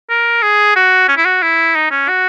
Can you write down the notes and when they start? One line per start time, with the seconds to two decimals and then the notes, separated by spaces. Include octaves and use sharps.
0.10 A#4
0.42 G#4
0.76 F#4
1.08 C#4
1.17 E4
1.25 F#4
1.42 E4
1.75 D#4
1.91 C#4
2.08 F#4